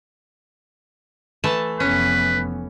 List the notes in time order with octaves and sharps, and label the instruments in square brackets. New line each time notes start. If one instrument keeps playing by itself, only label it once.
[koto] E3 A3 A5
[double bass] F1 B3 [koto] C#4 [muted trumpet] B4